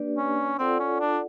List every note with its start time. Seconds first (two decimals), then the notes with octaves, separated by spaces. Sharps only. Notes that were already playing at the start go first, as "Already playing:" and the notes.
Already playing: A#3 D4 G4 B4 D5
0.17 C#4
0.59 C4 F4 A4 D5 F#5
0.80 C#4
1.00 D4